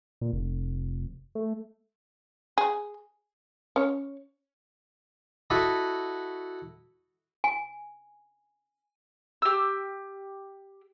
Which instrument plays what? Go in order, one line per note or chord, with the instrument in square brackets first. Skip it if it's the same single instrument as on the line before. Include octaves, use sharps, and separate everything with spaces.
[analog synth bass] A#2
F1
A3
[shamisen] G#4
C#4 C#5
[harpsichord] E4 F#4 A4 D#5 B5
[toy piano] G#5
[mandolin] G4 E6